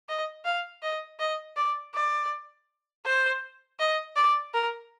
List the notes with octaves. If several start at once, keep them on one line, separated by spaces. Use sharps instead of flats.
D#5
F5
D#5
D#5
D5
D5
C5
D#5
D5
A#4